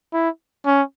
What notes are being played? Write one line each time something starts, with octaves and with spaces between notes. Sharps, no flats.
E4
C#4